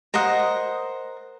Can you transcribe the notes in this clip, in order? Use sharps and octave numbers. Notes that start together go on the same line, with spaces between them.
A#4 C5 D#5 F#5